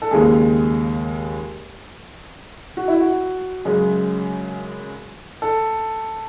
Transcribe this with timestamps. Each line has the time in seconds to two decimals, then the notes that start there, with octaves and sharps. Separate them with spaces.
0.02 A4
0.11 D#2 C#3 G#3 G#4
2.77 F#4
2.88 E4
3.00 F#4
3.65 F#2 C#3 G#3
5.42 A4